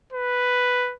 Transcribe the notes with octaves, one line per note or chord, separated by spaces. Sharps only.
B4